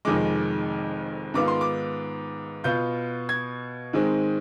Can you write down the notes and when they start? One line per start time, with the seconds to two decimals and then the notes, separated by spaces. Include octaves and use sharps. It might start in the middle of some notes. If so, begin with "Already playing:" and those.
0.05 F1 F2 D#3 G#3 D6
1.34 G#2 D#3 B3 F4 D6
1.48 C6
1.61 D6
2.64 B2 B3 F4 G6
3.29 G#6
3.93 G#2 D#3 G#3 C4